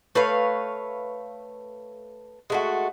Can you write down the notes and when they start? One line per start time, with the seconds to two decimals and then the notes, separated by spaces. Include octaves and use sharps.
0.15 A3 B4 C#5 F5
2.50 G#3 A3 F#4